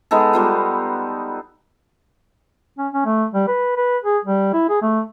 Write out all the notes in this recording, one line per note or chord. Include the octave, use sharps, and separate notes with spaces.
G#3 B3 D#4 A4
G3 B3 F4
C#4
C#4
A3
G3
B4
B4
G#4
G3
E4
G#4
A3